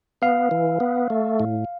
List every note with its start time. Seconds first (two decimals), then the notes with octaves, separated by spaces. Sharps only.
0.22 B3 F5
0.51 E3
0.80 B3
1.10 A3
1.40 A2